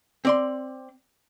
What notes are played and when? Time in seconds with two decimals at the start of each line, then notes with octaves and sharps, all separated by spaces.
0.25 C4 D5 C6